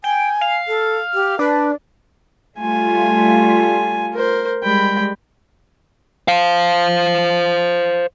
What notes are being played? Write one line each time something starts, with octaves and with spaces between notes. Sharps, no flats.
G5 G#5
F5
A4
G4
D4 B4
G3 A3 F4 G#5
A#4 C5
G3 G#3 G5 B5
C5 F5